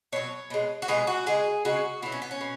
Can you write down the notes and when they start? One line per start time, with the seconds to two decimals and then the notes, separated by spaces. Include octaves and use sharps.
0.12 B2 F#3 C#5
0.50 B2 G#3
0.82 F#4
0.88 B2 G#3 G#4
1.07 F#4
1.26 C#3 G#3 G#4
1.65 C#3 G#3 F#4
2.02 B2 F#3 E4
2.12 C#4
2.22 B3
2.31 C#4
2.41 B2